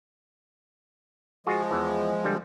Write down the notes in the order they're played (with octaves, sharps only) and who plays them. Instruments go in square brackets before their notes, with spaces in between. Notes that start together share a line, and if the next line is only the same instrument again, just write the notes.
[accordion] F3 G#3 [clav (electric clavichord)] F4 F#4 G#4
[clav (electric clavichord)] E2 E3
D3 G3